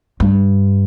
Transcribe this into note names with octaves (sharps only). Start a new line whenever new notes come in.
G2